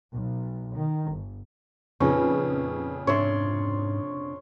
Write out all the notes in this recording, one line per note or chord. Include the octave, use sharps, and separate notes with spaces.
B1
D#3
G1
F2 A#2 C#3 C#4 D#4 B4
G#2 C3 D4 C#5 E5 C6